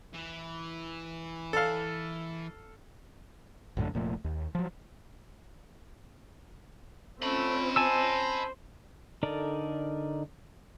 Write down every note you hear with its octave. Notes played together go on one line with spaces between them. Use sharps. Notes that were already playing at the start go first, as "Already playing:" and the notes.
E3
A4 F5
A#1 F#2 A2 D3
F1 A#2 F3 A3
D#2
F3 F#3
A3 C4 C#4 F4 D#5 B5
C5 G#5 A5 E6
D3 D#4 A4 A#4 D5